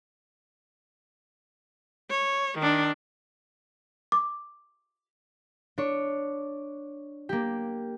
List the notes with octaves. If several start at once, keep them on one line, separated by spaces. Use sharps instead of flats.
C#5
D#3 D4
D6
D4 C#5
A#3 G4